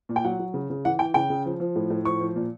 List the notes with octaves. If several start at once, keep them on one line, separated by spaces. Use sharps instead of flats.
A#2
G5
F#3 F#5
F#3
C#3
C#3
E3 F#5
E3 G5
C#3 G5
C#3
F3
F3
A2
A2
F3 C#6
F3
A#2